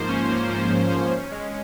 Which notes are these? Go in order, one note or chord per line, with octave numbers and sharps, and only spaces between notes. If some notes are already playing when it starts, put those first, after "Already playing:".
Already playing: G#2 F3 A#3 C5
C#4
A#3
F3
G#2
C#4
C#4
G#3